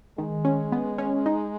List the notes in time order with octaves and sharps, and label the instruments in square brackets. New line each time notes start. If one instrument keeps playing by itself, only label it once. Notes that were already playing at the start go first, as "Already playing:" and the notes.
[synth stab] D#3 [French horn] G#3
[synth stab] C#4
B3
C#4
D#4